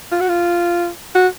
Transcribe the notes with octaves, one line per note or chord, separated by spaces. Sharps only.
F4
F#4
F4
F#4